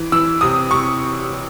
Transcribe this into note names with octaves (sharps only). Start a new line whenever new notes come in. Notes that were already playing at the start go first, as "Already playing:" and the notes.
Already playing: E3
E3 E6
C3 D#6
C3 C#6